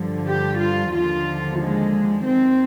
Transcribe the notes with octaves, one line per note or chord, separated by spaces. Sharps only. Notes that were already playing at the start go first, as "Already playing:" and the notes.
Already playing: G2 D3 F3
G4
F4
D#2 D3 F3 F4
G#3
D#2 D#3 C4